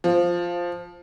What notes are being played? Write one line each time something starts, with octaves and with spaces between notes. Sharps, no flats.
F3